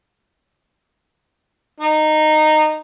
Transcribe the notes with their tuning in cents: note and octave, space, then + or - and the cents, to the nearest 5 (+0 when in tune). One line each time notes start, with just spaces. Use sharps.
D#4 -15